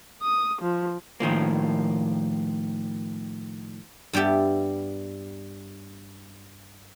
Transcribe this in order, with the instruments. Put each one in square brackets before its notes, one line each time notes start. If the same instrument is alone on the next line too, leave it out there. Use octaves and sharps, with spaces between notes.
[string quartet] D#6
F3
[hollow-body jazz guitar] A2 D#3 F3 A#3
[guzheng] G2 G3 B3 G4 E5